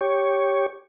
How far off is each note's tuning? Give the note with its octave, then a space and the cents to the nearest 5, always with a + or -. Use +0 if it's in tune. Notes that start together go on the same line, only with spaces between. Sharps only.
G4 +0 C#5 +0